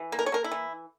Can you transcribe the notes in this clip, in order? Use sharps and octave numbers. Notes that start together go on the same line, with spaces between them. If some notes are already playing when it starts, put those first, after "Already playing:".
Already playing: E3
A#3
A#4
C#5
A#3 A#4
E4
E3